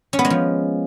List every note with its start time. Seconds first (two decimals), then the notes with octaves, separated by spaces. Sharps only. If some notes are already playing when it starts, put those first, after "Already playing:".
0.13 C#4
0.19 B3
0.25 G#3
0.30 F3